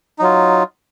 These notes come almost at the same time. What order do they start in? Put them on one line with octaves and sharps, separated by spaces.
D#4 F#3 F4